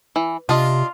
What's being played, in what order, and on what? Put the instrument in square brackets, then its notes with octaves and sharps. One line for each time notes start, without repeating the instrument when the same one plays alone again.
[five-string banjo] E3
[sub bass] C3 [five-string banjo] D4 D#5 [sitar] F4